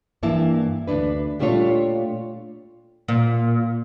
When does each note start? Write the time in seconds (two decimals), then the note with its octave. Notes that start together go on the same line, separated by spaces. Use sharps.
0.23 G2 E3 A#3 E4 A5
0.88 D2 C#3 D4 B4
1.40 A#2 G3 A3 D4 F4 C#5
3.08 A#2